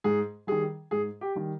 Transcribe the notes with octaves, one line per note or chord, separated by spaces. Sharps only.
G#2 G#4
D#3 G3 G#4
G#2 G#4
G4
D#3 G3